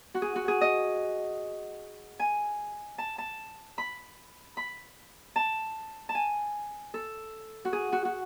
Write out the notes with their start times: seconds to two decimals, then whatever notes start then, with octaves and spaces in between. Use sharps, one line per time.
0.14 F#4
0.22 G#4
0.35 F#4
0.48 G#4
0.61 D#5
2.19 G#5
2.98 A5
3.18 A5
3.78 B5
4.57 B5
5.36 A5
6.09 A5
6.15 G#5
6.94 A4
7.65 F#4
7.73 G#4
7.92 F#4
8.05 F#4